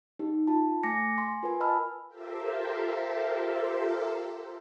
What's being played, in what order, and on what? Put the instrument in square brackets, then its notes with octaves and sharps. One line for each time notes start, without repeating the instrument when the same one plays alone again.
[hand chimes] D#4 G4
F4 A5
A3 G#5 D6 A#6 C#7
G#5 C6
F4 A#4 B4 G#5
D#5 G#5 A5 B5 E6 F6
[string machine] F4 G4 A4 A#4 C5 E5